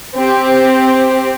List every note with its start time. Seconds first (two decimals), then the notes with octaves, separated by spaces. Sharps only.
0.14 C4 G4